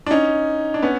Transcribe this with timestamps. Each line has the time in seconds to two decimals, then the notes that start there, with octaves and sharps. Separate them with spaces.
0.07 D4
0.11 C#4 D#4
0.74 D4
0.82 B3 C#4